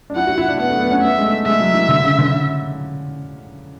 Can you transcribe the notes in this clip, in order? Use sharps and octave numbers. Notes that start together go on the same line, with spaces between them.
D4
E4 F#5
F#4
E4
D4
B3 F#5
A3
B3
C#4
B3 E5
G#3
A3
G#3 E5
F#3
E3
D3
C#3
D3